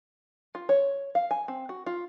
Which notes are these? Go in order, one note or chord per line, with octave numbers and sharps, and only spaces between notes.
F4
C#5
F5
G#5
C4
F#4
F4